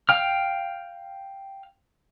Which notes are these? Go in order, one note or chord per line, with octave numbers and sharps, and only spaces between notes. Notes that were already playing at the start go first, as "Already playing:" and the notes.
F5 G5 F6